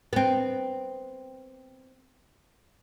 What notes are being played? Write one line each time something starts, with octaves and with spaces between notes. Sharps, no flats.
B3 C4